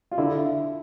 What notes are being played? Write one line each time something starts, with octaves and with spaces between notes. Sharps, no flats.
F4
D3 E4